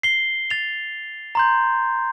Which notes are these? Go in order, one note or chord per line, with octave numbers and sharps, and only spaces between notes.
C7 G7
A6 F7
A#5 C6 G6